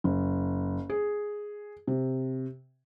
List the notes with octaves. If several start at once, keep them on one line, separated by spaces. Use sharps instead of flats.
F#1
G#4
C3